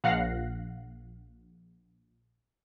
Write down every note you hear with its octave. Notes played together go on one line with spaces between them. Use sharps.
A#1 F5 F#5 F#6 A#6 C7